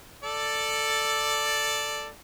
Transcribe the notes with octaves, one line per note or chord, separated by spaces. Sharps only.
A4 D5